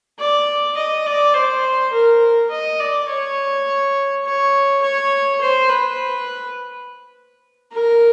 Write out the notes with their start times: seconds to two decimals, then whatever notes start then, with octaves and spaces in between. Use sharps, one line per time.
0.19 D5
0.77 D#5
1.06 D5
1.35 C5
1.93 A#4
2.51 D#5
2.80 D5
3.09 C#5
4.25 C#5
4.82 C#5
5.41 C5
5.70 B4
7.72 A#4